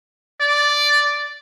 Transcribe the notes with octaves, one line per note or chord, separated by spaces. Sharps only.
D5